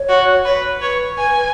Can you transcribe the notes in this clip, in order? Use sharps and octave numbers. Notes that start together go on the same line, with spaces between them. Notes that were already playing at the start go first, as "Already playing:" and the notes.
Already playing: C#5
F#4
B4
B4 C#5
G#5